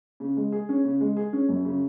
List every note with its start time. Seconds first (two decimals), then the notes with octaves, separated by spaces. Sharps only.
0.20 C#3
0.37 G#3
0.52 G#4
0.69 C#4
0.84 C#3
1.01 G#3
1.17 G#4
1.33 C#4
1.49 F#2
1.65 C#3